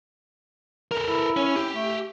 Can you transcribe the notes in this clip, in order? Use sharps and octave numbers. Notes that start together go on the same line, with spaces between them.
A4 A#4
E4
C#4
G4
A3